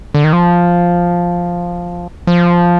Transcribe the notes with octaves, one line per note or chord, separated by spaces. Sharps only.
D3
D#3
F3
F3